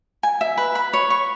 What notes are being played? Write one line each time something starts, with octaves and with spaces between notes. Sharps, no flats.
G#5
E5
B4
B5
C#5
C#6